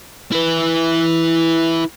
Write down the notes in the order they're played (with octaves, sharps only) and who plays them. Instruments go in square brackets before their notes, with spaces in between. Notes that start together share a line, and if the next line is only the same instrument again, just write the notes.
[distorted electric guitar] E4 B4